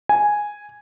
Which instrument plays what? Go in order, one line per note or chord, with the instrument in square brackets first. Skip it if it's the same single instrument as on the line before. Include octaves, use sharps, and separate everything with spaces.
[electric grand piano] G#5